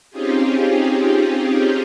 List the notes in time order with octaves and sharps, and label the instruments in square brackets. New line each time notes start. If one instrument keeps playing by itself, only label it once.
[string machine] C4 C#4 D#4 F4 G4 G#4